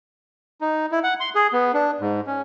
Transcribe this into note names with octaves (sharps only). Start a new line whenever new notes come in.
D#4
E4
F#5
C6
G#4
B3
D4
G#2
C#4